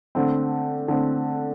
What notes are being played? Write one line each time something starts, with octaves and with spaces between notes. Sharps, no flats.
D3 A3 C4
D3 A3 C4